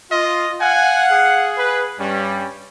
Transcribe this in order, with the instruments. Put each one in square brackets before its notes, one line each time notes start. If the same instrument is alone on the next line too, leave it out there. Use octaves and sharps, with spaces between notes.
[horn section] F4 [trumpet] D#5
[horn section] F5 F#5 [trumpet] G#5
[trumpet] G#4
[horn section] B4
[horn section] G2 G3 [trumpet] C#4